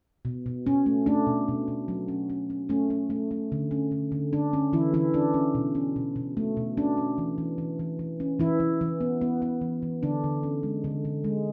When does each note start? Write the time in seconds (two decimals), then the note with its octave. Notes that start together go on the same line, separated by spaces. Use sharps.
0.25 B2
0.46 B2
0.66 B2 C#4
0.86 A3
1.06 A3 D4
1.27 B2
1.48 B2
1.68 B2
1.88 F#3
2.08 C#4
2.30 C#4
2.50 C#4
2.69 A3 C#4
2.90 C#4
3.10 A3
3.31 A3
3.52 D3
3.71 C#4
3.92 D3
4.12 D3
4.33 D3 D4
4.53 D3 C#4
4.73 D3 E3 E4
4.94 D3 E3 E4
5.14 C#4 D4
5.34 C#4
5.55 B2
5.75 C#4
5.96 B2
6.16 B2
6.37 A3
6.57 B2
6.77 C#4 D4
6.97 C#4
7.18 E3
7.38 E3
7.58 E3
7.79 E3
7.99 E3
8.20 C#4
8.40 E3 E4
8.60 E3
8.81 E3
9.01 B3
9.21 B3
9.42 B3
9.61 E3
9.82 E3
10.03 D3 D4
10.24 D3
10.43 C#4
10.63 G#3
10.84 D3
11.05 D3
11.24 G#3